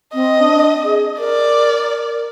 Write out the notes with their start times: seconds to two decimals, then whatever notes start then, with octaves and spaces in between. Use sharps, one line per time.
0.14 C4 D#5
0.40 D4
0.84 G#4
1.19 A#4 D5